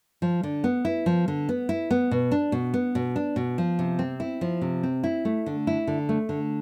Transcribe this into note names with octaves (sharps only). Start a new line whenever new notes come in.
F3
D3
B3
E4
F3
D3
B3
E4
B3
B2
D4
B2
B3
B2
D4
B2
F3
C3
C4
E4
F3
C3
C4
E4
A3
D3
E4
D3
A3
D3